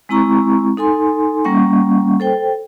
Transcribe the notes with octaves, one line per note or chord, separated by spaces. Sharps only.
G#3 C4 E4 A#5 C#6
D#4 A4 G#5 C6
G3 A#3 C#4 F#5 C#6
A4 C5 G5